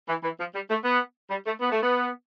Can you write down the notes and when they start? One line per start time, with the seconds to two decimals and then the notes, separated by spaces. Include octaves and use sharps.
0.09 E3
0.24 E3
0.39 F3
0.55 G3
0.70 A3
0.85 B3
1.30 G3
1.47 A3
1.61 B3
1.72 A3
1.82 B3